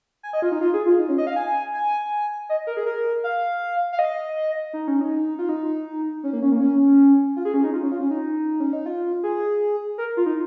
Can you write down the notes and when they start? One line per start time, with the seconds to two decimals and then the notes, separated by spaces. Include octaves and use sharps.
0.23 G#5
0.33 D#5
0.42 F4
0.52 D#4
0.61 F4
0.74 G#4
0.86 F4
0.99 D#4
1.09 C#4
1.18 D#5
1.27 F5
1.36 G#5
1.74 G#5
2.49 D#5
2.67 A#4
2.77 G#4
2.86 A#4
3.24 F5
3.93 F5
3.99 D#5
4.73 D#4
4.88 C#4
5.01 D#4
5.39 F4
5.49 D#4
6.24 C#4
6.33 A#3
6.42 C#4
6.52 A#3
6.61 C#4
7.36 F4
7.45 G#4
7.54 C#4
7.64 D#4
7.73 F4
7.83 C#4
7.92 F4
8.01 C#4
8.11 D#4
8.60 C#4
8.73 D#4
8.86 F4
9.23 G#4
9.98 A#4
10.17 F4
10.26 D#4